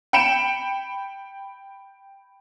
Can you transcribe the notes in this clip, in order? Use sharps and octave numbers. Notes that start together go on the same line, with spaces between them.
G5 B5 C#7 D7 E7